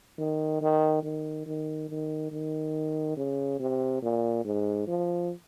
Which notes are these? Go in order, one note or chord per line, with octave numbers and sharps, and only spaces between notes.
D#3
D#3
D#3
D#3
D#3
D#3
C#3
C3
A#2
G#2
F3